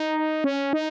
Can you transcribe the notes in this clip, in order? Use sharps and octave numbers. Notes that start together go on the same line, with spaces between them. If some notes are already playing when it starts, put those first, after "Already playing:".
Already playing: D#4
C#4
D#4